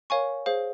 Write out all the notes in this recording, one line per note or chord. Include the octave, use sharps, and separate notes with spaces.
A#4 C#5 F5 G#5 C#6
G#4 C5 F5